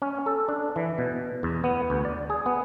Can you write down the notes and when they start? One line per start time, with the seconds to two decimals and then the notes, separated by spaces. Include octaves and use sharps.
0.02 C#4
0.26 A4
0.48 D4
0.76 E3
0.98 B2
1.43 E2
1.64 B3
1.90 D2
2.05 D5
2.30 G#4
2.46 B3